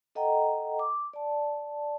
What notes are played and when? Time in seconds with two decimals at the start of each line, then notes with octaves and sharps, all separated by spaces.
0.15 A4 D#5 F#5 G5 A#5
0.79 D6
1.13 D5 A5